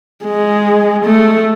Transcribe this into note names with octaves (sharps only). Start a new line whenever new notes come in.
G#3
A3